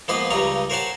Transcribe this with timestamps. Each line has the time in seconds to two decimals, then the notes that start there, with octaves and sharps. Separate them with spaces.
0.08 F3 G#3 A#3 B3 B4 C6
0.30 C#2 G2 C#3 G3 C#5 A#5
0.70 A#4 C5 C#5 F#5 G#5 A5